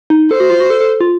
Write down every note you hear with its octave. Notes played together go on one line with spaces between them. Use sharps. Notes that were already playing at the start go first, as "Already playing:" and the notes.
D#4
A4 C5
F#4
F4
F#4
A4
A4
F4